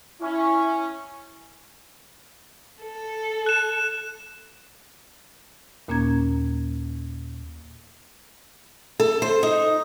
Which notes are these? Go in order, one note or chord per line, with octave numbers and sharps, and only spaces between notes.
C#4 E4
A4
F#6 E7
D#2 A#2 A#3 C#4 A#5 G#6
A4
C5
D#4